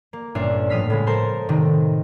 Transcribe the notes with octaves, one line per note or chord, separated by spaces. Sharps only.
A#3
G1 A#2 C#4 D4 E5 C7
A2 F3 D#6 F6 B6 C7
A2 C#3 G#3
A4 A#4 C5 A5 C6 G6
A2 C3 D#3